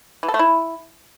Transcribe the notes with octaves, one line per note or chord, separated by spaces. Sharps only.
E3
A4
A3
E4